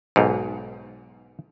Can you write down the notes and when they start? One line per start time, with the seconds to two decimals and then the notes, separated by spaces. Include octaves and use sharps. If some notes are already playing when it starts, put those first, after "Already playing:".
0.16 B1 G#2